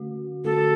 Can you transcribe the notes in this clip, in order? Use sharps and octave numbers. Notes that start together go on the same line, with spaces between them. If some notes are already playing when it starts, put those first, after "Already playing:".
Already playing: D3 A3 F#4
D3 A3 F#4 A4